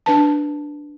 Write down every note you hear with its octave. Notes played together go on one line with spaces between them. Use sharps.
D4 B4 A5